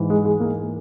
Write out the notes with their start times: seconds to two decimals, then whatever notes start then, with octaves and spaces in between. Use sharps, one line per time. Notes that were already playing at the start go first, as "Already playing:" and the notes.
Already playing: G#2 E3
0.10 G#3
0.25 G#3
0.40 A#3